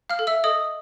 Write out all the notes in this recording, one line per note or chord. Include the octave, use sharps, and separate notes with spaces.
F5 F6
A4
E5 E6
A4 D#5 D#6